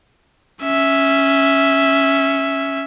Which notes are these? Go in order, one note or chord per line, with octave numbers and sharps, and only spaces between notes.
C#4 E5